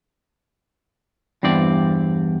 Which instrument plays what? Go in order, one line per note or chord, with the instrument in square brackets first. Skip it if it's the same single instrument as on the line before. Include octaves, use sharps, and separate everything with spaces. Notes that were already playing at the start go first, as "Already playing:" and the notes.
[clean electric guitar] E2 G2 C4 D5